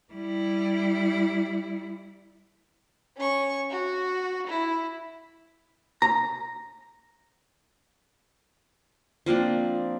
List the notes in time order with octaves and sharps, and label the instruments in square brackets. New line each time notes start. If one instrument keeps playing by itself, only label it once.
[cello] G3 E4
[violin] C#4 C#6
F#4
E4
[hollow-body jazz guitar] A#5
[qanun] F3 A#3 C4 D4